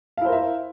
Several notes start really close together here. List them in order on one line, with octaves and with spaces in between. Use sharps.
F5 E4 C5 A#4 E5